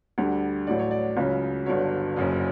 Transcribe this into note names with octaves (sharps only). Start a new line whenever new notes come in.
D2 D3 G3
A1 A2 F#3 D5
C#5
D5
C#2 C#3 F#3
G1 G2 D3 F#3 C#5
F#1 F#2 C#3 F#3